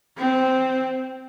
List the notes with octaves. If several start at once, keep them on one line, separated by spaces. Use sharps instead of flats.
C4